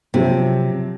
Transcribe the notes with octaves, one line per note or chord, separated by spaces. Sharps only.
C3 F3 F#3 C4